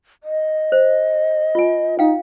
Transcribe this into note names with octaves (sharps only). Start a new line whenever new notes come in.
D#5
C5
F4 G#5
D#4 F5 G5